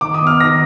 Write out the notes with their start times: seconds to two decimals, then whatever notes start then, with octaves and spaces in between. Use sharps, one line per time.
0.01 D#3 D6
0.14 D#6
0.21 B3
0.27 F6
0.40 D#3 A#6